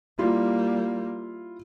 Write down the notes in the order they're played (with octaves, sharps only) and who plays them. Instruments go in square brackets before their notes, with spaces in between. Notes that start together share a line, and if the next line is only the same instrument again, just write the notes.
[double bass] G3 A#3 [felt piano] E4 F4